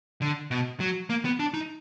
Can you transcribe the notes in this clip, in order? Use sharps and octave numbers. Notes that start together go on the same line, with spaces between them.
D3
B2
F#3
A#3
B3
D4
D#4